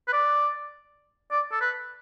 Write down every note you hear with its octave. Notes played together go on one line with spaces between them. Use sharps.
B4
D5
D5
A4
B4